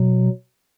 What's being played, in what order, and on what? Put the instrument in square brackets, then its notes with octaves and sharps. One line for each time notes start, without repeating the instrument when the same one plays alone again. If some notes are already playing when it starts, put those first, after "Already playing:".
Already playing: [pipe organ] B2 F#3